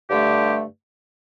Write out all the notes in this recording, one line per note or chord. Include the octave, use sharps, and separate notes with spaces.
G2 D3 A3 G4